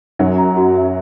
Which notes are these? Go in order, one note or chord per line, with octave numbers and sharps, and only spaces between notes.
F#2 F#3 F#4
A#5
F#4
E5